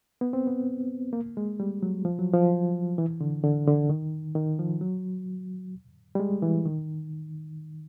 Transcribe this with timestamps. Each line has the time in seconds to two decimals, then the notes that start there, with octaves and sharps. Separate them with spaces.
0.21 B3
0.33 C4
0.47 B3
1.13 A#3
1.37 G#3
1.60 G3
1.83 F#3
2.05 F3
2.19 F#3
2.34 F3
2.98 E3
3.21 D3
3.43 D3
3.67 D3
3.89 D#3
4.35 D#3
4.59 F3
4.81 F#3
6.15 G3
6.20 G#3
6.42 E3
6.65 D#3